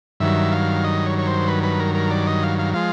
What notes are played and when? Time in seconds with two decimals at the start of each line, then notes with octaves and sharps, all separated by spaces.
0.20 G2 D#3 F#3 E5
0.52 F5
0.84 D#5
1.06 C#5
1.18 C#5
1.27 C5
1.48 B4
1.63 B4
1.80 A#4
1.95 A#4
2.11 D5
2.27 D#5
2.43 F5
2.59 F5
2.74 F3 G#3 F5